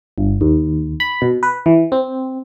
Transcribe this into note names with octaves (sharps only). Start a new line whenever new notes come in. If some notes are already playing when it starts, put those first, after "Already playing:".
G1
D#2
B5
B2
B4
E3
C4